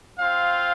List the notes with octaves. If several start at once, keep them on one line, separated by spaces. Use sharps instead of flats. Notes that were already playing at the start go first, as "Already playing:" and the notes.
C4 F4 F5